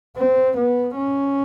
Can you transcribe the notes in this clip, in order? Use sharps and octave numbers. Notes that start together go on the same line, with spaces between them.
C4
B3
C#4